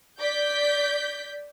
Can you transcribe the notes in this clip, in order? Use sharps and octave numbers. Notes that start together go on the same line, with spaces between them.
D5 G6 B6